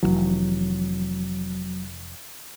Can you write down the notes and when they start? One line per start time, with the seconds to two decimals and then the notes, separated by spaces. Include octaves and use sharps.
0.03 F1 B1 E3 F#3